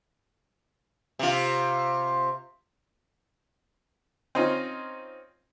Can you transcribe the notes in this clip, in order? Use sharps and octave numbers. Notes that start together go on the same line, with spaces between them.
C3 F4
C4 C#4 D#4 F4